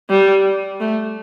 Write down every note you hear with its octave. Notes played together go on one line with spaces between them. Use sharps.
G3
A3